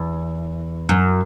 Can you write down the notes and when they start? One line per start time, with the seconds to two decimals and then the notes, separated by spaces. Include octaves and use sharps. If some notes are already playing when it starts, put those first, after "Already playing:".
Already playing: E2
0.89 F#2